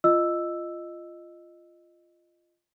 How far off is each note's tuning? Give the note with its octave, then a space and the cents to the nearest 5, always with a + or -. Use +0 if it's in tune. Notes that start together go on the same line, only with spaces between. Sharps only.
F4 -10 D#5 -10 E6 +0